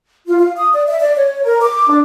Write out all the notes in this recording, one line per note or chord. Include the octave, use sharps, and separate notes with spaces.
F4
F5
D#6
D5
E5
D5
C#5
A#4
D6
D4